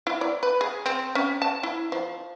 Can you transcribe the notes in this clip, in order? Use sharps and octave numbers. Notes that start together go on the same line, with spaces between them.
E4
D5
B4
G#4
C4
C#4
A5
E4
F3